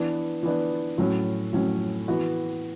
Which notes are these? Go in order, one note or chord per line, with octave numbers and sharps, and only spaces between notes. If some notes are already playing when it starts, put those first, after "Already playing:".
Already playing: E3 B3 D4
E3 B3 D4
A2 F#3 C#4
A2 F#3 C#4
E3 B3 F#4